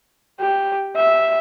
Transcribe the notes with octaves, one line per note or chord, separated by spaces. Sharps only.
G4
E5